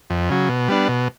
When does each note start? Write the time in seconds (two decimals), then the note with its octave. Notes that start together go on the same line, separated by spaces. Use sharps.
0.10 F2
0.29 C#3 F#3
0.49 B2
0.68 G3 B3 D4
0.89 B2